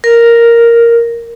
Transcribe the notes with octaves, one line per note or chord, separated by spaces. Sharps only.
A#4